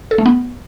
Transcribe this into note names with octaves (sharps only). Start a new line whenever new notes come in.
A4
A3
B3